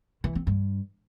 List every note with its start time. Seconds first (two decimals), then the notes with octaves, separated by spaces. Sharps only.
0.24 E3
0.35 C4
0.47 G2